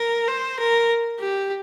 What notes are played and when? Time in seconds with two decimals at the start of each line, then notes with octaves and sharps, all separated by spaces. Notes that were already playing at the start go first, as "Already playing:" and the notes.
Already playing: A#4
0.28 C5
0.59 A#4
1.20 G4